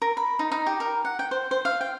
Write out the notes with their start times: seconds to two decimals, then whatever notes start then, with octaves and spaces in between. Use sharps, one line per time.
0.02 A#4
0.17 B5
0.39 D#4
0.52 D#4
0.66 G4
0.80 A#4
1.05 F#5
1.19 G5
1.31 C5
1.51 C5
1.65 F5
1.81 G5